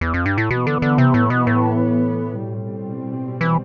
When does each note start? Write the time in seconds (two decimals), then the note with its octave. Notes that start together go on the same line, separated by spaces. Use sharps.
0.01 E2
0.14 F2
0.26 G2
0.38 A2
0.50 B2 E3 B3
0.67 D3
0.82 D3
0.98 C3
1.14 A2
1.30 B2
1.47 A2
2.43 B2 G3 C4
3.41 E3